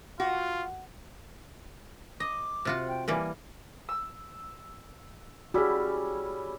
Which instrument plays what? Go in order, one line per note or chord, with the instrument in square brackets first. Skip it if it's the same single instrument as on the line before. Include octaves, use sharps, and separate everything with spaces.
[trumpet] F4 [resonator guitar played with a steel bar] F#4
[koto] D#5 [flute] D6
[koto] C3 F4 F#4
[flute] G5
[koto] E3 G3 A#3 [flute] G#5
[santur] E6
[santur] G3 C#4 E4 [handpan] F#4 G#4